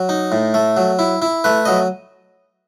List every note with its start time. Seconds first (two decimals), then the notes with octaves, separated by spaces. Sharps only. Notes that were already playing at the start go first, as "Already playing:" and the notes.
Already playing: F#3
0.09 D#4
0.32 A2
0.54 A3
0.77 F#3
0.99 E4
1.22 E4
1.44 A3 B4
1.65 F#3 D#5